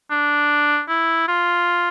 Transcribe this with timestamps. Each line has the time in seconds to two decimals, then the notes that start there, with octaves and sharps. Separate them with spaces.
0.10 D4
0.89 E4
1.28 F4